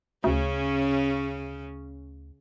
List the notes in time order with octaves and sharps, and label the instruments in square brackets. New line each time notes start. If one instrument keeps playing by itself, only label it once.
[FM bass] D2 [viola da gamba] C#3 C#4